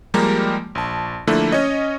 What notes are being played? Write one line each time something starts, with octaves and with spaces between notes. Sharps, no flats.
F3 G3 G#3 A#3 G4 A#4
A#1 A5
D3 F3 A3 A#3 E4
C#4 C#5 D#5